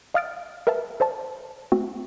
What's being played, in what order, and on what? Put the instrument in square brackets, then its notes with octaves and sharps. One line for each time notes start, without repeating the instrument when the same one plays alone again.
[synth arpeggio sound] D#5 F5 D#6 F6 A6 D7
A#4 B4 E5 F5 A5
A4 C5 D5 A5
A3 C4 F#4